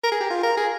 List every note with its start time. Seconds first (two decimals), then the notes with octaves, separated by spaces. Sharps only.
0.03 A#4
0.12 G#4
0.20 G4
0.30 F4
0.43 A#4
0.57 G#4